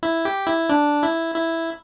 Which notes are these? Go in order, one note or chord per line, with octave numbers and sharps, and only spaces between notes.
E4
G4
E4
D4
E4
E4